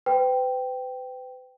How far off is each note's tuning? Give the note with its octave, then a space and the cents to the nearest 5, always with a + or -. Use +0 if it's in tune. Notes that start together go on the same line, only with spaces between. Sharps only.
B4 +40 G5 -5